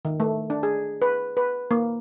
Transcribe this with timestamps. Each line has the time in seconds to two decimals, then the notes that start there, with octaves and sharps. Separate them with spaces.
0.05 D#3
0.20 A3
0.50 D4
0.63 G#4
1.02 B4
1.37 B4
1.71 A#3